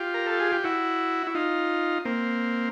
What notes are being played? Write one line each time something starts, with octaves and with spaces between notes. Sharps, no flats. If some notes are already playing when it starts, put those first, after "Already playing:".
Already playing: F4 G4
A#4
A4
G#4
G4
E4 F#4
E4
D#4 F4
A#3 C4